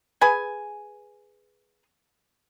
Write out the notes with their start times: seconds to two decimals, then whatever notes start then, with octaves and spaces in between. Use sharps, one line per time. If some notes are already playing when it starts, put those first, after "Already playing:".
0.21 G#4 B4 G#5